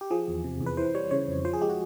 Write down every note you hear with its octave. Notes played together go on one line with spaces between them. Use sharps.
G4
F3 G#4
E2
C3
E2
B4
E3 C5
G3 C#5
C#3 C#5
F2
F3 C5
G#4
G#3 G4
F#4